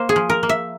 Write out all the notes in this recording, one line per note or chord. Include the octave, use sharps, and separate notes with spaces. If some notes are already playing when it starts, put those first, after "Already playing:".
Already playing: A#3 C5
G#4
F3
A#4
A#3
E5